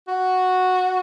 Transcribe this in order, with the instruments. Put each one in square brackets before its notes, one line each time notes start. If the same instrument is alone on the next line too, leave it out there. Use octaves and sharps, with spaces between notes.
[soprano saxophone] F#4